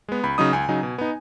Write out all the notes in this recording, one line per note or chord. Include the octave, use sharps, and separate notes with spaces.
G#3 B3
C#2 B5
C#3 F#3 D#4 D#6
C#2 G#5
C#3 F#3 D#4
B2
B3 D#4